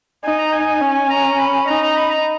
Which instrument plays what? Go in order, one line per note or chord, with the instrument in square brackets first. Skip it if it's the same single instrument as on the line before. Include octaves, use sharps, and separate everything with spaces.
[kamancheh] D#4 [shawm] G#5
[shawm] A#5
G#5
[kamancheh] C#4
[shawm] A#5
B5
[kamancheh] D#4 [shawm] A#5
[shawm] A#5
B5
A#5